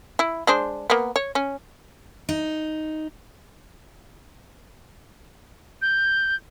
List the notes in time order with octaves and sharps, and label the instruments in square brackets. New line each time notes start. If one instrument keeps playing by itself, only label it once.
[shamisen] E4
G#3 D4 C5
A#3 B3
C#5
C#4
[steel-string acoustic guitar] D#4
[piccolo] G6